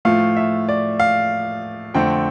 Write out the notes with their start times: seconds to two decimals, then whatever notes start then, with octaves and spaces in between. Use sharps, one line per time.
0.05 A2 F3 A3 F5
0.37 E5
0.69 D5
1.00 F5
1.94 F2 D3 A3 C4 G5